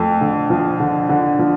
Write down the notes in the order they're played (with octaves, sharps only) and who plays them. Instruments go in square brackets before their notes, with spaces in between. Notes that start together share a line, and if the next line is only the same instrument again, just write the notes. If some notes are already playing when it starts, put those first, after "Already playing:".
Already playing: [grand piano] F2 [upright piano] A3
[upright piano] D3
F3
D3
D3
F3